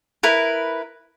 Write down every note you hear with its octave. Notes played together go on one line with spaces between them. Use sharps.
E4 A#4 B4